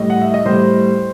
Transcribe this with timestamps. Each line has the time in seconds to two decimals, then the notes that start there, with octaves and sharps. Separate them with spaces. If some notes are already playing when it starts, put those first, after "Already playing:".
Already playing: A2 G3 D#5
0.10 F#5
0.21 E5
0.34 D#5
0.45 A2 G3 C5